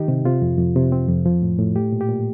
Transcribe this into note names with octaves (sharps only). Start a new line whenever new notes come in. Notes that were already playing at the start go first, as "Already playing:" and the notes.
Already playing: D#3 D#4 G4
C3
C3 F4
F2
F2
C3
C4
F2
F3
A2
A2
A3 G4
A#2
G4
A#2